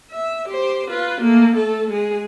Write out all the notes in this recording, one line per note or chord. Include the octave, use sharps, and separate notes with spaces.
E5
G4 C5
F4 B4
A3 A#3
A3 A4
G#3 G#4